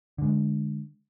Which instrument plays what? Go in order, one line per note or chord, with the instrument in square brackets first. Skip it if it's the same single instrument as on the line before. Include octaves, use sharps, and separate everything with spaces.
[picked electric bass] D3 G#3